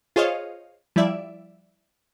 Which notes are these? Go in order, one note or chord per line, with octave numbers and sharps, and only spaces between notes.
F4 G#4 C5 C#5 D#5 F5
F3 G3 E4 D5 E5